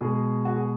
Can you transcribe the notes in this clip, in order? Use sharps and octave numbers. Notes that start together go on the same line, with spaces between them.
B2 G#3 G#4
F#4
G#4